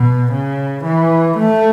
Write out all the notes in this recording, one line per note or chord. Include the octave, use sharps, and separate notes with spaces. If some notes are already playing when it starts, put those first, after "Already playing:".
Already playing: B2
C#3
E3
A3